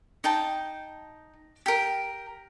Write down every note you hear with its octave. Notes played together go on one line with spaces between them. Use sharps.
D#4 G5 A5
G4 A#4